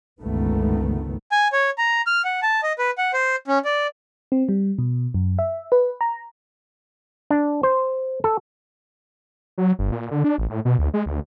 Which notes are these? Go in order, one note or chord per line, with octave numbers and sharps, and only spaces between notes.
G1 C#2 D#3 A3 B3
G#5
C#5
A#5
F6
F#5
A5
D#5
B4
F#5
C5
C#4
D5
C4
G3
B2
F#2
E5
B4
A#5
D4
C5
A4
F#3
G1
A#2
D3
D4
A1
A2
B2
D2
G#3
D2